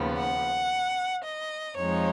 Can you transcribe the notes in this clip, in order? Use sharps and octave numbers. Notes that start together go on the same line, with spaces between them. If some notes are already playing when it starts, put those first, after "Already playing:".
Already playing: D#2 C#3 F3 B3
F#5
D#5
F2 F3 G#3 D#4 C#5